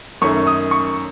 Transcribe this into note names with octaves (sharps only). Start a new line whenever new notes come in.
F#2 D#3 A3 C#4 C#6
D#6
C#6